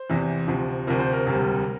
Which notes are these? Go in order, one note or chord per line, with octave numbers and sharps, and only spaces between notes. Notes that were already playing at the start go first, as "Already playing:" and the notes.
Already playing: C5
E2 C3 E3
D2 C3 F3
D2 C3 F3 A#4
C5
A#4
E1 D2 C3 G3